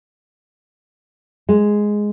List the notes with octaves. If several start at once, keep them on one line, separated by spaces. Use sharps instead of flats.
G#3